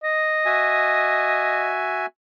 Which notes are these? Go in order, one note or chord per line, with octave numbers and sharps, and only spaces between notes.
D#5
F#4 E5 G#5